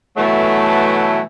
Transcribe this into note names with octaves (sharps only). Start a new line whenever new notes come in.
B2 E3 F#3 A3